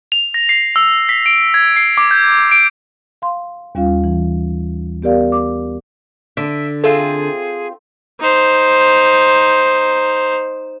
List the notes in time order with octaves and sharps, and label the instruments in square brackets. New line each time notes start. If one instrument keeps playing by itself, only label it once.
[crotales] F7
A#6
C7
E6
B6
D7
G#6
C7
D6
G6
D7
[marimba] F5 C6
D#2 G3 C#4 F4 F5
E3
B3 G4 A#4 D5 F5
D6
[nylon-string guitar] D3 [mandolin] E5 [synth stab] D7
[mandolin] C4 F4 [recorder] G#4 [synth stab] A4 E5
[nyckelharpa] D#4 C5